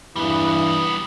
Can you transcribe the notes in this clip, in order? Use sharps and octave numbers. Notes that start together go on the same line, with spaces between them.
E2 G2 E3 G3 B3